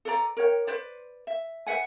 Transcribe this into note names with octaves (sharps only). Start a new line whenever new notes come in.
A4 B4 D5 A#5
A#4 C#5 G5
B4 C5 D5
E5
B4 E5 F#5 G#5